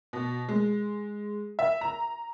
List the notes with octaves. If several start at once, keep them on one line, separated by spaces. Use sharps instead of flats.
B2
G#3
E5
A#5